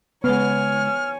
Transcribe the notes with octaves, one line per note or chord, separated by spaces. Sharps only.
C#3 G#3 B3 C#5 G#5 F6